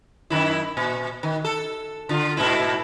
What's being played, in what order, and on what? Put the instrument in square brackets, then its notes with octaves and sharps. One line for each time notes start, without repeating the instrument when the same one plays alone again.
[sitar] F#2 D#3 E4
A#2
D#3
A4
D3 F4
G#2 B2 E4